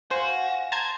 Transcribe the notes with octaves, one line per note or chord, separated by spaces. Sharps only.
F#4 C5 F5 F#5 G#5
C5 A5 A#5 G#6